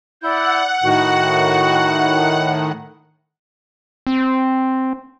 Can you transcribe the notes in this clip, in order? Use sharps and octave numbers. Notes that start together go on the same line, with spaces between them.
E4 D5 F#5 G6
A2 D#3 F#4
C4